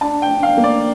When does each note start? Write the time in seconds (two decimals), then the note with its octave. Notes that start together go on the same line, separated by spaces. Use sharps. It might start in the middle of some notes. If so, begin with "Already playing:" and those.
0.01 D4 A5
0.22 G5
0.29 D4
0.43 F5
0.57 A#3
0.64 D5